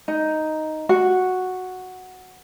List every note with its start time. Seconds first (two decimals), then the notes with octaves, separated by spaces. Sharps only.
0.08 D#4
0.89 F#4